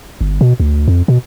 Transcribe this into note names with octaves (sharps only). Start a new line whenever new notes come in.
G1
B2
D2
F2
B2